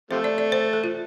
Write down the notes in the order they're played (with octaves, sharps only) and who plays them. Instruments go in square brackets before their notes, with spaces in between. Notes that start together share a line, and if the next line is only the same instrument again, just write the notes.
[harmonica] C3 F3 A3 [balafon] C5
[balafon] D5
D5
C5
A4
F4